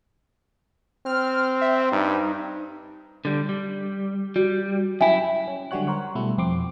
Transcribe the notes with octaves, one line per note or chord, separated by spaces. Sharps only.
C4 F6
E5
G2 D#4
D3 G3
G3
G3 F#4
F#2 E4 E5 G5 G#5
C#4
D3 F#3 G3 F#4 C#5 F#6
A#4 C5 C#5 F#5
B2 G3 A3 E4
F2 C4 C6 D6